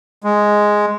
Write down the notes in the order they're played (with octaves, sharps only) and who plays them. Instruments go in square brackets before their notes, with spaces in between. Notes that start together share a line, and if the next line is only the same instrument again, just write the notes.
[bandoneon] G#3